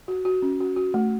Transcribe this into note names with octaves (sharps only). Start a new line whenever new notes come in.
F#4
F#4
C#4
F#4
F#4
A3